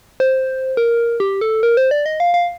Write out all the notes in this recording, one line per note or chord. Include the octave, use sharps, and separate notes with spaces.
C5
A#4
G4
A4
A#4
C5
D5
D#5
F5
F5